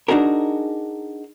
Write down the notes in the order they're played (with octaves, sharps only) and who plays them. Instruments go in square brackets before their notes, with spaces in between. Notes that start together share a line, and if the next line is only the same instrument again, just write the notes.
[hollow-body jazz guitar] D4 D#4 F#4 G#4 A#4